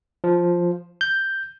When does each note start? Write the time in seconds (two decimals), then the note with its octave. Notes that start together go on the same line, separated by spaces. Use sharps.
0.24 F3
1.01 G6